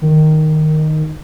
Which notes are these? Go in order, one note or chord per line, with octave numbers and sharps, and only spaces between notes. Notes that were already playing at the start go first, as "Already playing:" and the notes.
D#3